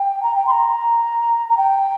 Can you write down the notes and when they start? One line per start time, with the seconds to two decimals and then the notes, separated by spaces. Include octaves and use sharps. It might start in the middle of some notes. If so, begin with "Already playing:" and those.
Already playing: G5
0.23 A#5
0.35 G5
0.47 C6
0.51 A#5
1.49 A#5
1.57 G5